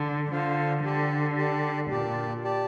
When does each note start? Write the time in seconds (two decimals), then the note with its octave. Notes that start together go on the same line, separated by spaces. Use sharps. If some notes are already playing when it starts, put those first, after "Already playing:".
Already playing: D3
0.31 D3 F4 C5 F5
0.84 D3 G4 D5 A5
1.37 G4 D5 A5
1.90 A#2 G4 D5 A5
2.44 G4 D5 A5